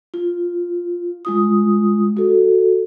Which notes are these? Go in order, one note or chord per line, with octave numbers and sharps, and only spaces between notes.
F4
G#3 F4 D#6
F#4 A4